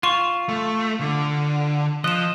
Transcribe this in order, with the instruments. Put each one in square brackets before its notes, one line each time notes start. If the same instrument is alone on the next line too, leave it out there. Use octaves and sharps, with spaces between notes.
[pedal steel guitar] F4 [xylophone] C6 C#6 E7
[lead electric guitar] A3
D3
[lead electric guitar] F3 [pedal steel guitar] D#5 [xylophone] F#6 E7